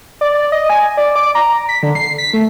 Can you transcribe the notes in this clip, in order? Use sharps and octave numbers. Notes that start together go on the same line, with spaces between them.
D5
D#5
G#5
D5
D6
A#5
B6
D3
C7
B6
A3